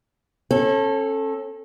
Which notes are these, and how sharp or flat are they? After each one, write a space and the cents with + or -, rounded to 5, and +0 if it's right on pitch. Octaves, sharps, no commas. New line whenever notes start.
C#4 -35 A4 +0